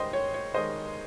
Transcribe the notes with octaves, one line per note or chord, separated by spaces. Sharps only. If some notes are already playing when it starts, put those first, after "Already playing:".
Already playing: G2 D#3 G#3 C5 D#5 G5
C#5
C#5
D#3 G#3 C5 D#5